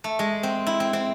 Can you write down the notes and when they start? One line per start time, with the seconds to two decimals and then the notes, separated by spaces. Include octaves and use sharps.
0.04 A3
0.19 G#3
0.43 C4
0.67 E4
0.80 C4
0.93 C4